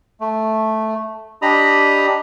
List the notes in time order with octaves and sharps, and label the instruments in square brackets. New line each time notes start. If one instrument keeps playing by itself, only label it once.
[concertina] A3
D4 G4 D#5 A#5 B5 D#6